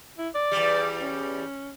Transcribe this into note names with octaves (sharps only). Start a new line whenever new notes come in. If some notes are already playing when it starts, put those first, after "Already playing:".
E4
D5
E2 G3
C#4